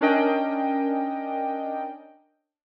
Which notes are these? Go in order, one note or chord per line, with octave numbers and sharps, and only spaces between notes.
C#4 D4 A#4 D#5 G5